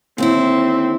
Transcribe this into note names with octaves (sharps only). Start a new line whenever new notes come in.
D#2 D3 C4 E4